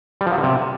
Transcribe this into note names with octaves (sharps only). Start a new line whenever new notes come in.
G3
F3
F#3
D3
C3